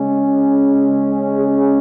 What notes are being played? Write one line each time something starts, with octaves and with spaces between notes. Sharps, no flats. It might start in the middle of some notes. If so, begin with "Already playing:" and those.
Already playing: C#3 G#3 C#4
G#4